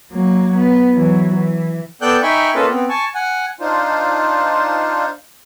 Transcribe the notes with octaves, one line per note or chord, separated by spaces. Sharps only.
F#3 A#3
B3
E3 F#3
E3
B3 A4 D5 G5 F#6 G6
D#4 E5 G5 G#5 B5 C#6
A#3 C#4 F4 A4 B4 D#5
B3 C4
G#5 A5 C#6
F#5 G#5
D4 D#4 F4 C5